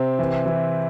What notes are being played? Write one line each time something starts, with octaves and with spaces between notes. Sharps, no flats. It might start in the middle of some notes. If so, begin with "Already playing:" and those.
Already playing: C3 C4
E3
E3